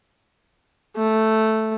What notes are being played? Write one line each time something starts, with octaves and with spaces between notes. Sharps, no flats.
A3